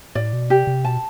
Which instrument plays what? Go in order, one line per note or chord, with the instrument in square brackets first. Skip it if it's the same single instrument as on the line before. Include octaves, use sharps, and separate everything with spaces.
[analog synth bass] A2 [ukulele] D5
[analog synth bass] B2
[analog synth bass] C3 [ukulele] G4
[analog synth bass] C3
[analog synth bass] B2 [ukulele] A5